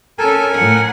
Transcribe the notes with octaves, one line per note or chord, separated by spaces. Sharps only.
C#4 A4 A#4 G#5
A2 F#5